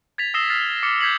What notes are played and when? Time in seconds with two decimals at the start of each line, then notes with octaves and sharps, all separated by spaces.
0.18 G#6 A6 B6 F7
0.34 D#6 E6 A#6 C7 E7 G7
0.50 F6 A6 C7
0.83 D6 F6 A6 C#7
1.01 G6 G#6 B6 C7 F#7